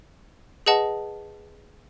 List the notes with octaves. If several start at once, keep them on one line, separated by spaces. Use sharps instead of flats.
G#4 B4 D#5 F#5 A5